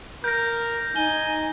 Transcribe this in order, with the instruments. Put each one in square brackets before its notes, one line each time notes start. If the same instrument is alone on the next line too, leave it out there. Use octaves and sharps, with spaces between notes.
[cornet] A#4 [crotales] G6 A#6
[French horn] D#4 [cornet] G#5 [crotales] G7